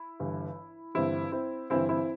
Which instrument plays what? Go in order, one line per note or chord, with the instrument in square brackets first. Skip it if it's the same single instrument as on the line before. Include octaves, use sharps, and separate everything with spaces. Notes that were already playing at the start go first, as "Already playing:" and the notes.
Already playing: [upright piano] E4
G1 G2 E3
G1 G2 E3 C4 E4
C4 E4
G1 G2 E3 C4 E4
C4 E4